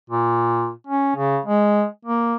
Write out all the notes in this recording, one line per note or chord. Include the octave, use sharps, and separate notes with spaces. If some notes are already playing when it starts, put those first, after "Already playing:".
A#2
C#4
C#3
G#3
A#3